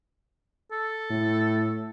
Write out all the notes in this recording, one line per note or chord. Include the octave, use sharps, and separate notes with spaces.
A4
A2